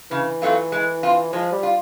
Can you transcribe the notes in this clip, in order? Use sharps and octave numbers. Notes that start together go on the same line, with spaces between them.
C#3 E3
F#3 A3 C4 F4
G#3
C4 F4
F3 G#3
G3
F4